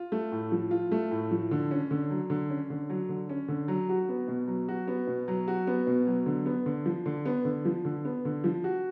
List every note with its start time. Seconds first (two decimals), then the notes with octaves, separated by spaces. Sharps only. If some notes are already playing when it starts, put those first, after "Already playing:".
Already playing: F4
0.12 A3
0.32 A2
0.52 F3
0.71 F4
0.92 A3
1.11 A2
1.31 F3
1.51 D3
1.71 C#4
1.91 D3
2.10 F#3
2.30 D3
2.50 C#4
2.70 D3
2.90 F#3
3.09 D3
3.29 C#4
3.48 D3
3.68 F#3
3.89 F#4
4.09 B3
4.28 B2
4.48 F#3
4.68 F#4
4.88 B3
5.07 B2
5.28 F#3
5.48 F#4
5.67 B3
5.87 B2
6.07 F#3
6.26 D3
6.46 B3
6.66 D3
6.86 F3
7.06 D3
7.26 B3
7.45 D3
7.65 F3
7.85 D3
8.05 B3
8.25 D3
8.44 F3
8.64 F#4